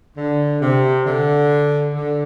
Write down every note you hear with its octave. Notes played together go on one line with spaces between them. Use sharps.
D3
C3
D3
D3